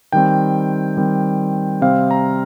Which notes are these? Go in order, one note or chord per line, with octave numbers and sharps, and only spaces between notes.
D#3 G3 C4 G5
D#3 G3 C4
C3 G3 C4 F5
A#5